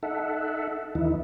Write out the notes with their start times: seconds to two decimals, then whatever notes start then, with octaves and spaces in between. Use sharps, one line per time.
0.03 D#4 A4 E5 F#5
0.95 D#2 E3 D#4 E4